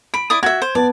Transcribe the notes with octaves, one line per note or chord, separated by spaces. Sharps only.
B5 D7
E4 D5 D#6
F#4 E5 G#6
C5
B3 D5 A5